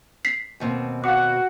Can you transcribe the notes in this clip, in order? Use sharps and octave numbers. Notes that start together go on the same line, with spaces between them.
B6 C7
D#2 B2 C4
F#4 F5 F#5 D6